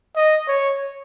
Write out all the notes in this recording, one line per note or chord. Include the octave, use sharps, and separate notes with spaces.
D#5
C#5